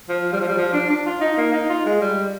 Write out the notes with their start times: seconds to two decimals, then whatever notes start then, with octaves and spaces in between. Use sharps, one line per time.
0.09 F3
0.33 G3
0.41 F3
0.49 G3
0.58 F3
0.73 D4
0.90 D4
1.06 F4
1.21 D#4
1.38 A#3
1.53 D#4
1.69 F4
1.86 G#3
2.01 G3